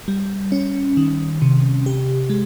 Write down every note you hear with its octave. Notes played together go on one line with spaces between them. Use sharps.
G3
C#4
D#3
C3
G4
G#3